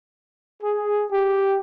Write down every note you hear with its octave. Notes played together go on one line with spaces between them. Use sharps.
G#4
G4